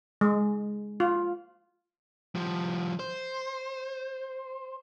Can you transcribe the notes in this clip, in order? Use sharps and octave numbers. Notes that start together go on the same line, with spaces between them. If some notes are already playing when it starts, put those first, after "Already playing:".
G#3
F4
F3 G3
C5